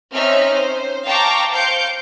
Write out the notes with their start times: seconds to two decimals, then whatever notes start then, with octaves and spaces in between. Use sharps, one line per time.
0.13 C4 C#4 D#4 E5 F6
0.53 C5
1.05 F5 G5 A5 A#5 C#6 D6
1.54 C5 F5 G6 C#7 D7